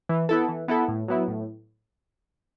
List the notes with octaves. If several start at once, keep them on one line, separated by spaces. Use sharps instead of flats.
E3
B3 E4 A4
E3
B3 E4 A4
A2
F#3 B3 E4
A2